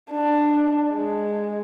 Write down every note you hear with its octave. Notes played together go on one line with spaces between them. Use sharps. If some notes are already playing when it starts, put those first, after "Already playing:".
D4
G#3